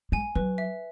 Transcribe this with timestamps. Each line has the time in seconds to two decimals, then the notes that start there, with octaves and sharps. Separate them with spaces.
0.12 G#3 G#5
0.35 F#3 B4
0.58 E5